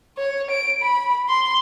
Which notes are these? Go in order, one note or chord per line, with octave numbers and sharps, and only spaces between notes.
C#5
D7
B5
C6